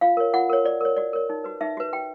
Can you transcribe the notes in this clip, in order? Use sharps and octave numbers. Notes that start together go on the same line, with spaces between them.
F4 F5
A#4 C#5
F4 F#5
A#4 C#5
F#4 D5
A#4 C#5
F#4 D5
A#4 C#5
D#4
F#4 B4
D#4 E5
F#4 B4
F#4 G5